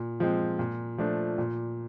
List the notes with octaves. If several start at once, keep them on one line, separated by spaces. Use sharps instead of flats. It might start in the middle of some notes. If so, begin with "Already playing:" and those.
Already playing: A#2
F3 G#3 C4
A#2
F3 A3 D4
A#2